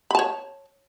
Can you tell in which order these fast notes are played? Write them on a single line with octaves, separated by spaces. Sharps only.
B5 A5 C#5